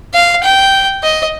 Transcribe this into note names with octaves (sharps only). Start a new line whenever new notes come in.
F5
G5
D#5